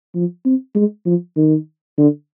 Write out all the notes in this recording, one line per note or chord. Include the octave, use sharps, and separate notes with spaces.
F3
C4
G#3
F3
D#3
D3